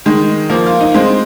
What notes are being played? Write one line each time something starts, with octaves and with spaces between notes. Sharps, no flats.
D#3 G#3
F3 A#3
F4
D#4
G#3 C4